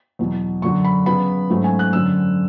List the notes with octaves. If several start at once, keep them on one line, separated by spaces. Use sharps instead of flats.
E2 B2 F#3
F#2 D3 F#3 C#6
B5
C#3 F#3 B3 B5
G#2 F#3 A3 C#4
G#5
F#6
F#2 D3 F#3 C#4 E6